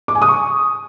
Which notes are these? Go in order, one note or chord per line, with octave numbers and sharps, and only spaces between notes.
D6
G#5
D#6
C#6